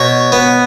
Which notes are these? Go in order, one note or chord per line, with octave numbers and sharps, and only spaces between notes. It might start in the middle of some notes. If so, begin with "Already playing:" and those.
Already playing: B2 C#5
B3